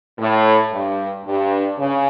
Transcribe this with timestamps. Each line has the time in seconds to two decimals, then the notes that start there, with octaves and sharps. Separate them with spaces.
0.19 A2
0.72 G2
1.26 G2
1.79 C#3